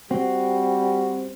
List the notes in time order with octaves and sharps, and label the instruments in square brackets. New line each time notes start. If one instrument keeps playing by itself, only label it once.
[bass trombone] G3 [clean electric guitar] C4 [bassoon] F#4